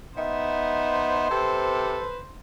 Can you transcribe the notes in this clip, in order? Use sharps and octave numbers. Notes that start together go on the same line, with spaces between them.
B3 D#4 C5 E5
C3 A4 B4